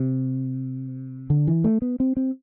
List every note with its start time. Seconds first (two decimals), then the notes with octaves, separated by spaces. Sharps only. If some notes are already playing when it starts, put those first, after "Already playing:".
Already playing: C3
1.30 D3
1.47 E3
1.64 A3
1.82 B3
2.00 C4
2.17 C4